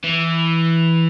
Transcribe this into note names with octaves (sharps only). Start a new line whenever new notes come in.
E3